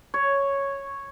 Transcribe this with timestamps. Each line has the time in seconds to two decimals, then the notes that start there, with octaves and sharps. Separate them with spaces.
0.14 C#5